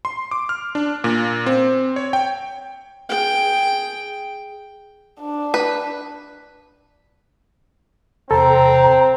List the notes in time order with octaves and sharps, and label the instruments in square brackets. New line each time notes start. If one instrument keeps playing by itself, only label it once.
[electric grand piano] C6
D6
F6
D4
A#2
C4
C#5
G5
[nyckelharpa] G#4 G5
[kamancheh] D4
[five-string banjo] B4
[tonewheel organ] E2 C3 [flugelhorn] C4 [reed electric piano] A4 A5 [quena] A#5